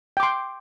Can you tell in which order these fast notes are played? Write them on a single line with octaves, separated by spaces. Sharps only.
G5 D6 C6